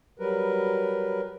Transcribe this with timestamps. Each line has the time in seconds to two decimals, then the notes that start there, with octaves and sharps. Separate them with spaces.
0.19 F#3 G3 A#4 B4